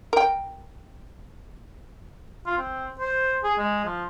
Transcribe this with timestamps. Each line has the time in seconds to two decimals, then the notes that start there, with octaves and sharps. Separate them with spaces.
0.13 A#4 G5
2.46 F4
2.58 C4
2.99 C5
3.43 G#4
3.58 G#3
3.84 F3